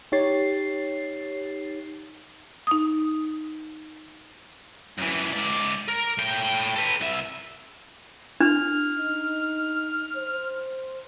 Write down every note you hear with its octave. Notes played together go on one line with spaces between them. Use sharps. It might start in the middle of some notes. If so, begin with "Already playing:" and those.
D#4 G4 C#5 A6 C7
D#4 D#6
F#2 E3
G#2 D5
A#4
A2 G5
A4 B4
C2 E5
D4 F6
D#4
C5